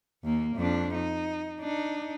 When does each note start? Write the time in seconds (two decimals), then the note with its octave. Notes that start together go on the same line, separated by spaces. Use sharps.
0.24 D#2 A#3
0.57 F2 D4
0.94 D#4
1.61 D4 D#4